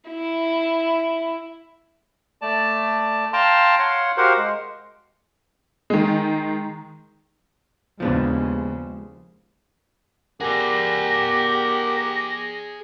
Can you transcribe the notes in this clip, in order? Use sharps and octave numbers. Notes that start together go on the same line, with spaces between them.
E4
A3 D5 A5
F5 G5 A5 A#5 C6
C#5 F5 F#5 C6
F#4 G4 A#4 C5 F5 F#5
G#3
D#3 G#3
D#2 C#3 F3 G#3 B3 D4
G4 G#4 A#4 D5 F#5 A#6